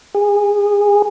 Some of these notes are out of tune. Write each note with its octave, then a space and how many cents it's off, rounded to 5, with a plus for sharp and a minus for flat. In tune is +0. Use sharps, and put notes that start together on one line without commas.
G#4 -25